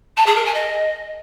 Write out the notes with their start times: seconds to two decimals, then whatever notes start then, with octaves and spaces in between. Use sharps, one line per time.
0.17 A5
0.26 G#4
0.35 A#4
0.45 G#5
0.54 D#5